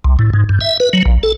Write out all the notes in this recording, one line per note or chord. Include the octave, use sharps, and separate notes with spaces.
C2
A2
G#2
G2
E5
B4
F#3
A#1
A4